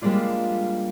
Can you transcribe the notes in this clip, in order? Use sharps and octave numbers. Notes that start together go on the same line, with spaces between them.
G3 G#3 A#3 D4 F4